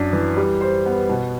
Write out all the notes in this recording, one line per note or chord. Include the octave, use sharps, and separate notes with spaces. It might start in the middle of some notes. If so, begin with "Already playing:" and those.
Already playing: F#2 D4
E3
G3
C5
B3
B2